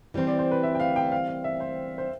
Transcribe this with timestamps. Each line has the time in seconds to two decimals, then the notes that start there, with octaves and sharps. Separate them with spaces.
0.14 E3 G3 C4 C5
0.27 D5
0.39 C5
0.51 B4
0.63 E5
0.75 G5
0.80 F5
0.96 G5
1.12 F5
1.28 F5
1.44 E5
1.60 C5
1.98 C5